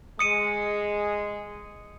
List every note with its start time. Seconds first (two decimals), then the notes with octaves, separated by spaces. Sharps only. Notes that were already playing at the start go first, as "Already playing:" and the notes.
0.19 G#3 D#6 C#7 D#7